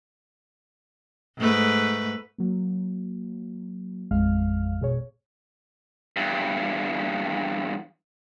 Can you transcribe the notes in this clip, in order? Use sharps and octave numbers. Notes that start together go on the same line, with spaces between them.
G#2 A3 B4
F#3 A#3
A1 F2 G#3 F5 F6
B2 G#4 C#5
E2 G2